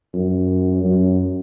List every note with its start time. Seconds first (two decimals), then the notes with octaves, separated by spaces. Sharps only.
0.14 F#2
0.84 F#2